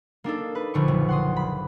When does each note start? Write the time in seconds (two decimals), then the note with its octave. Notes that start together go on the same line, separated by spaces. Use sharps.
0.24 A#3 D4 D#4 A4
0.55 B4
0.74 A#1 D3 C#6
0.88 F#1
1.09 F#5 C6 D#6
1.36 B5